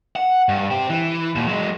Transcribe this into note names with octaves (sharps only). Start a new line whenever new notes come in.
F#5
G2
C4 G4
E3
D#2 A#2
F#3 G#3